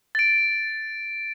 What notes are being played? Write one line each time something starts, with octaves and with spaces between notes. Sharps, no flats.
A6 D7